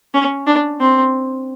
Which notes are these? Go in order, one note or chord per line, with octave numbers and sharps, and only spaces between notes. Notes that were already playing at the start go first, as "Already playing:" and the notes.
C#4
D4
C4